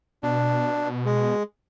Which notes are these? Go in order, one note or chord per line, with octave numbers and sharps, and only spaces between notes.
B2 D4
G#3